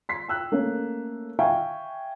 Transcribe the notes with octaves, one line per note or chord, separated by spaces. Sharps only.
C6 B6 C7
G5 E6 F#6
A3 A#3 C#4
E5 F5 G5 G#5 C#6